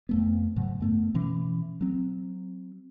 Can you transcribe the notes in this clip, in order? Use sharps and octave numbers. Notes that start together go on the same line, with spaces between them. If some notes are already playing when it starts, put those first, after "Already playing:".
F2 A3 B3
G#2 C#3 F#3
F#2 A3 B3
B2 E3 C#4
F#3 C4